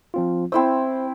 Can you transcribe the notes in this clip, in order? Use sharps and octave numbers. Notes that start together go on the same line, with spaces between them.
F3 C4 F4
C4 E4 C5 E6